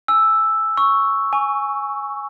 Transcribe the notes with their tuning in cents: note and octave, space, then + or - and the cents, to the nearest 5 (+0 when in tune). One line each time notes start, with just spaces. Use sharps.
G#5 +0 E6 +0
C#6 +0 E6 +0
G#5 +0 C#6 +25